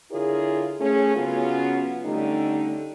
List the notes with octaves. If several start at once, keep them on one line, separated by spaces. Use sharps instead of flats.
D3 E4 F4 G#4 A#4 C#5
A3 C#4 G#4
C#3 F#3 B3 C#4 F4
D3 G3 A3 C#4 D#4